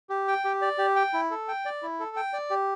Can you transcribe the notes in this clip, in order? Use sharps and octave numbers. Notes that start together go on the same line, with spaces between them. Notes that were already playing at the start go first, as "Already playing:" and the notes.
G4
G5
G4
D5
G4
G5
E4
A4
G5
D5
E4
A4
G5
D5
G4